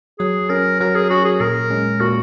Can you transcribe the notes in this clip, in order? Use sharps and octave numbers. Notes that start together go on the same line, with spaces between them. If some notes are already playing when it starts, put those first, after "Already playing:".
F#3 G#4
C#4 A#4
F#3 A#4
G#4
C#4 F#4
G#4
A#2 A#4
G#3 C#4
A#2 F#4